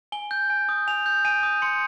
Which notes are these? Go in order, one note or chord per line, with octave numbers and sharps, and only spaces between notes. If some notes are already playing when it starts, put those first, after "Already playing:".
G#5 G7
G6
G#5
D#6
G#5 F7
G6
G#5 D#7
D#6
C6 C#7